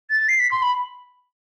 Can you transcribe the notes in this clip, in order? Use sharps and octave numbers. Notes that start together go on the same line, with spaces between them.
A6
C7
B6
C6
B5